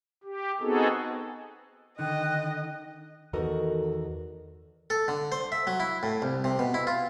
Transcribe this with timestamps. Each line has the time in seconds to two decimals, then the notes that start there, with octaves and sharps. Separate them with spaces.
0.24 G4
0.60 B3 C4 D#4 F#4 G#4 A4
1.99 D3 D#3 D#5 G5 F#6
3.33 E2 D#3 F#4 A4 A#4 D#5
4.90 A4
5.08 D3
5.32 C5
5.52 E5
5.67 F#3
5.80 E4
6.03 A2
6.22 C2
6.44 C3
6.59 B2
6.74 E4
6.87 F4